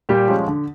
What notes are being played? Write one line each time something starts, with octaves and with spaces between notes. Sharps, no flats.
A#2 G3 G4
F3 G#3 C#4
D3